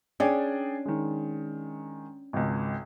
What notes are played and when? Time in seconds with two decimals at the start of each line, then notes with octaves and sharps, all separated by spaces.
0.20 C#4 D4 G#4 D5 G5
0.86 D#3 G#3
2.33 G#1 C#2